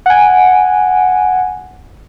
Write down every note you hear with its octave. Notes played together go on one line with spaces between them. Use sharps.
F#5 G#5